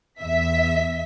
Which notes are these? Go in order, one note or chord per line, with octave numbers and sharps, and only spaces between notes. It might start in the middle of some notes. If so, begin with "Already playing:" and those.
E2 E5 B6